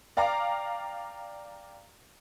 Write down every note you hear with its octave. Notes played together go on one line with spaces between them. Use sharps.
D5 F5 G5 A#5 D6